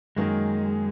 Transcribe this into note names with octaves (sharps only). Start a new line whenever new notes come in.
F#2 D#3 G#3 A#3 D#4